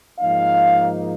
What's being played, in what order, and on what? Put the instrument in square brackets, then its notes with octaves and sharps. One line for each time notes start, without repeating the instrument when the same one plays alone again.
[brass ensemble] G#2 F3 A#3 D#4 F5